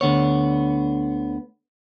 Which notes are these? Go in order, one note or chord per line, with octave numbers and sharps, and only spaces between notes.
D2 D3 B3 C#5